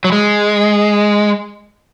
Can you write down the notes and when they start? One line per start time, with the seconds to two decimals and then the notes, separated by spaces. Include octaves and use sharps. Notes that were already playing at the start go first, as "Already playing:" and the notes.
0.04 F#3
0.12 G#3